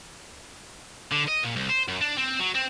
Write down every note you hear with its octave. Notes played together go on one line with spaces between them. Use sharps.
D3
D#5
A#2
C2
C5
F#2
D4
C4
F#3
C4